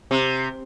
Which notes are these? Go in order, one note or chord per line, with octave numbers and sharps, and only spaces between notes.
C3